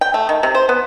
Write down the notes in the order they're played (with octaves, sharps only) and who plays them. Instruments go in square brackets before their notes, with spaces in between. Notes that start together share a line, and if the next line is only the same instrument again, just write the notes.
[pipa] G5
A3
D#3
C3
C5
B3